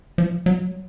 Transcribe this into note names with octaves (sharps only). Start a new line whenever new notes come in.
F3
F#3